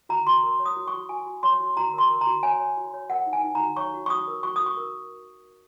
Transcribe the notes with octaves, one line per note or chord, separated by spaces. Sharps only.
F#4 A#5
F#4 C6
A#4
C#5
D#6
F#4
C#6
F#4
F#4 G#5
F#4
C#5 C6
F#4
F#4 A#5
A#4 C6
A#4
A#5
F#4
C#5 G#5
C#5
F#4
C#5
A#4 F#5
D#4
G#5
D#4
F#4 A#5
C#5 C#6
F#4
C#6
F#4 D#6
A#4
F#4 C#6
F#4 D#6
C#6
A#4